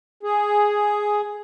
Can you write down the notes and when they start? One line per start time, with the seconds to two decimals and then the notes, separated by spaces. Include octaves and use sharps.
0.23 G#4